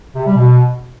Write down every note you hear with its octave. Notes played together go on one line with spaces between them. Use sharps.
C3
G3
B2